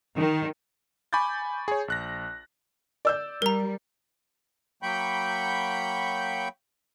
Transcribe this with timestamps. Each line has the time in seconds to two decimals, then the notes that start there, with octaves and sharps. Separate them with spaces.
0.16 D#3
1.13 G#5 B5 C#6 D6 G6 A6
1.68 G#4 C#5
1.88 A#1 F#6 A#6
3.05 D5 E6 G6
3.42 G3 A#4 A#5
4.83 F#3 A#3 G5 B5 C#6 G6